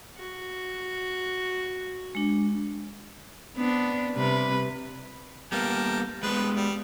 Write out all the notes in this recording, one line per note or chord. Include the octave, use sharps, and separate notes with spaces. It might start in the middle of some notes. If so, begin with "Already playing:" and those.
F#4
G#3 D4
B3 C4 D4
C3 G3 B4
G3 A#3 B3 A#4 G5 A5
F3 G3 G#3 B3 B4
G3